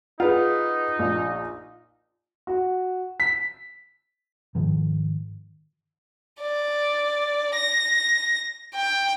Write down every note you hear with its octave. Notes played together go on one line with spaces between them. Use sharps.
D#4 F4 G#4 B4 F#5
A#1
F#4
B6
G#2 D#3 F3
D5
A#6
G5